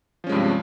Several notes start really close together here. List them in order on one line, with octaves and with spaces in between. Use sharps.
F3 C#4 G#3 G2 C3